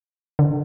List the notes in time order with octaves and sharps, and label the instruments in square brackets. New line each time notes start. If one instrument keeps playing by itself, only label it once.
[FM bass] D3